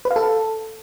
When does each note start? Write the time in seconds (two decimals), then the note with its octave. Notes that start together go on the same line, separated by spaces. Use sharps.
0.05 B4
0.11 F5
0.16 A4